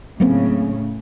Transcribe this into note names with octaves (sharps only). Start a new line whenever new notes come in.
A2 C#3 F#3 A#3 C4